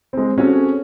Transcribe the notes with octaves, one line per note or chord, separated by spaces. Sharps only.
G#3 C4
C4 C#4 F#4 G#4 A4